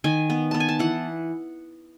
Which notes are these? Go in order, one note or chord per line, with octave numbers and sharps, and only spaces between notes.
D#3 G#5
B3
B3 A5
G#5
A5
E3 F#5